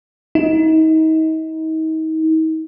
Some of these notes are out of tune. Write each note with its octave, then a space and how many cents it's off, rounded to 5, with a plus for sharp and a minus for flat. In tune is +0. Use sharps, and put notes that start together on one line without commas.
D#4 +35